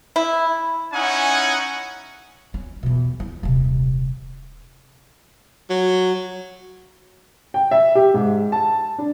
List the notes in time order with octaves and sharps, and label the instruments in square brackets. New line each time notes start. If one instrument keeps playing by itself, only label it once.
[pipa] E4
[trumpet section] C#4 D#4 E4 F#5 G#5
[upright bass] C#4
E2 B2
E4
D#1 C3
[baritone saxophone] F#3
[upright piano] G5
E5
G4
G#2
A5
D4